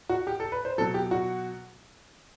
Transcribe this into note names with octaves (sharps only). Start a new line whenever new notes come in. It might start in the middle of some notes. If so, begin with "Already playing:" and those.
F#4
G4
A4
B4
C5
B2 F#3 A4
G4
F#4